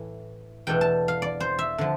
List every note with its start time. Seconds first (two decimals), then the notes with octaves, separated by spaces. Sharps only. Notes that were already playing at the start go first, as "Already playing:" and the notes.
Already playing: A2 E3
0.67 E2 B2 A3 D4 G5
0.81 A5
1.08 F5
1.22 D5
1.40 C5
1.59 E5
1.78 D3 F3